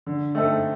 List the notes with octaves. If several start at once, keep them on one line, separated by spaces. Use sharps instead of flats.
D3
A3 C4 D#4 A4